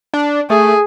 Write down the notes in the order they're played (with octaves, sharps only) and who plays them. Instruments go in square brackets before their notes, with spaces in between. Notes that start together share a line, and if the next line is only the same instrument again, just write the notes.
[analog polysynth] D4
[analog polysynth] A3 [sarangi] G#4